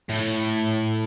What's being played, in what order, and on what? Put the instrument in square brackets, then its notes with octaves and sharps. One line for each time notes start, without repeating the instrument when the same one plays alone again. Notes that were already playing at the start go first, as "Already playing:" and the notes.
[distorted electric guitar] A2